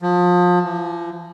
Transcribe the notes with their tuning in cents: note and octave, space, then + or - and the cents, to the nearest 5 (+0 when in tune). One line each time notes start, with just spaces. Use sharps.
F3 +30
F3 -40